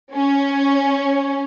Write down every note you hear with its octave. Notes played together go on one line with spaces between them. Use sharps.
C#4